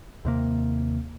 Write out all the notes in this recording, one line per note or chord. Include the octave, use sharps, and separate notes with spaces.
D#2 C3 A#3